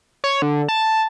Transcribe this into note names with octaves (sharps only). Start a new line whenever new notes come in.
C#5
D3
A5